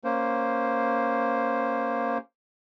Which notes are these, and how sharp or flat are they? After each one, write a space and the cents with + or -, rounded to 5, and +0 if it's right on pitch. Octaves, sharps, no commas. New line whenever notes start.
A#3 +0 C#4 +0 C5 +0